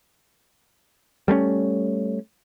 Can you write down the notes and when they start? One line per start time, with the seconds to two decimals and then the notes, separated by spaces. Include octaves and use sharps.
1.28 G3 A3 A#3 C#4